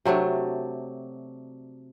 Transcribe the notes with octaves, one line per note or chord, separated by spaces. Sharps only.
C3 F#3 A3 D4